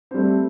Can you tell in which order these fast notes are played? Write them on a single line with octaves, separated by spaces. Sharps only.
C4 G3 A3